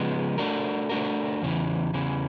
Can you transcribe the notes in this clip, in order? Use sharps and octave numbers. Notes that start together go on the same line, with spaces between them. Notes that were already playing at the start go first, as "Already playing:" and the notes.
Already playing: C#3 F3 G#3 B3
A3 D4 F#4 A#4
A3 D4 F#4 A#4
E2 C#3 E3
E2 C#3 E3